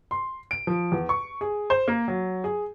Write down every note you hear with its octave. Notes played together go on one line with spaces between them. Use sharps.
C6
D7
F3
E2
C#6
G#4
C5
A#3
F#3
G#4